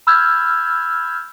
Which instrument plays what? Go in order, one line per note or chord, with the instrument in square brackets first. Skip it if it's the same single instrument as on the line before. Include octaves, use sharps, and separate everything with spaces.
[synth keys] B5 E6 F6 G6 G#6